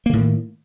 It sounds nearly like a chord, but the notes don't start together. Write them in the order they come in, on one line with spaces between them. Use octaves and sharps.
A#3 D3 A2 D#3